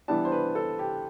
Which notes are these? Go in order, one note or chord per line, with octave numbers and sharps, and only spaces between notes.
E3 G3 B3 D4 A5
C5
B4
A4
G4